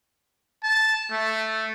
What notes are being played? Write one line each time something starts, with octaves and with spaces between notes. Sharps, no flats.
A5
A3